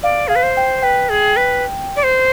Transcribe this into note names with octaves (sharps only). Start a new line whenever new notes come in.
D5 F5
G#4 F5
B4
C5
G5
B4 G5
G#4
B4
D5
C5